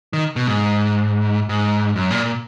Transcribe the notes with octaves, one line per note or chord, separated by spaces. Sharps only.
D#3
B2
G#2
G#2
F#2
A#2
A#2